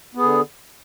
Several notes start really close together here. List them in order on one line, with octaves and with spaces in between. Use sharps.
B3 G#4 D3